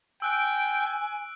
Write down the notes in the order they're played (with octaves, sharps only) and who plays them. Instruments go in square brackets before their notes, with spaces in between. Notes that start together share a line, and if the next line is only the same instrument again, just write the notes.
[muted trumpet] G5 [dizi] G#5 [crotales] E6 F#6 D7